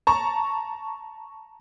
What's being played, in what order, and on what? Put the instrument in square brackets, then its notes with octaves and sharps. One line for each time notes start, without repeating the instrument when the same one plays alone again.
[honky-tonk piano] A5 A#5 C#6